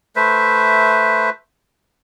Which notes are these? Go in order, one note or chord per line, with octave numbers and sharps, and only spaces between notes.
A3 B4 C5 E5